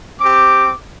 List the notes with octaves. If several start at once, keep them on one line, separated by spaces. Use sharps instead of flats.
C4 G4 D6